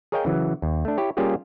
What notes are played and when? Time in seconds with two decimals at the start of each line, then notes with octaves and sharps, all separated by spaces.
0.12 G#4 A#4 C#5 D#5 F5 G5
0.25 C#3 E3 F#3
0.62 D#2
0.85 A3 D4
0.98 E4 G4 C#5
1.17 G3 A#3 C#4 F4 G4 G#4